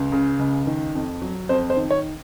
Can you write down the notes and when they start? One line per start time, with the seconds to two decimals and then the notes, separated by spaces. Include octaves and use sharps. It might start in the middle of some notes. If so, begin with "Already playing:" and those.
Already playing: C#2
0.12 C#3
0.39 C#2
0.67 D#3
0.95 F2
1.22 F#3
1.49 F2 C5
1.70 C5
1.77 D#3
1.91 C#5